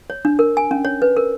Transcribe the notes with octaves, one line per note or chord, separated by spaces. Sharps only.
C#5
D4
A#4
G#5
C#4
C#5
B4
A#4